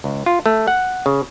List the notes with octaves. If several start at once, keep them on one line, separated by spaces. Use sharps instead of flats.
C#2
F4
A3
F#5
C#3